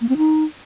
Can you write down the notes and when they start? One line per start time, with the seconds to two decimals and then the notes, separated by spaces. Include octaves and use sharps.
0.01 A#3
0.09 C4
0.17 D#4